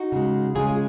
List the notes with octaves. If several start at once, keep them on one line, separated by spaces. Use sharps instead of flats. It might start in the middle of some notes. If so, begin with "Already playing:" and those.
Already playing: D#4 F#4
C#3 G#3
C#3 G#3 F4 G#4